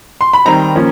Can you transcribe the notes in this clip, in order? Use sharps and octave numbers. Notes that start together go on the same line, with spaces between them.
C6
B5
D#3 G3 C4 D#4 A#5
F3 A#3 C#4